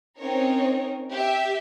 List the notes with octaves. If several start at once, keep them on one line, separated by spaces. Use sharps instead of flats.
C4 C#4 D#4 A#4 C#5
G4 E5